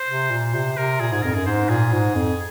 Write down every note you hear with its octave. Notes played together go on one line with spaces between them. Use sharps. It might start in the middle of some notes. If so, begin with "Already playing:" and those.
Already playing: C5
C3
A#2
C3 C5
C3 A#4
A#2 G#4
G#2 G#4
F2 A#4
F#2 G#4
G#2 C5
A#2 G#4
G#2
F2